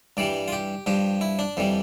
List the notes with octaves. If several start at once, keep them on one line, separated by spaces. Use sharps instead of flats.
G2 E3 G3 D5
F4
G4
G2 F3 G4
E4
D4
F2 E3 G3